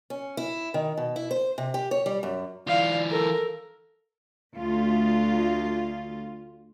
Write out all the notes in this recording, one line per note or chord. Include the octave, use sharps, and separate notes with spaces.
C#4
E4
D#3
B2
E4
C5
C3
G4
C#5
G3
F#2
E3 F4 D5 F5
A4 A#4
D2 F4